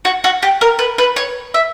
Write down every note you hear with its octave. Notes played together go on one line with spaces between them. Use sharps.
F#4
F#4
G4
A#4
B4
B4
C#5
E5